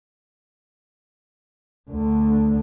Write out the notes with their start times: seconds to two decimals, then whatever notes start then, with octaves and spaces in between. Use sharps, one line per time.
1.90 D2 D3